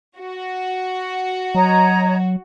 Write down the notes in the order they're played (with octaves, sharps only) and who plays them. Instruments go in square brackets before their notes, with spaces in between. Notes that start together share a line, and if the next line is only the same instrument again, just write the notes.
[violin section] F#4
[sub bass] F#3 [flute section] C#5 D#5 A#5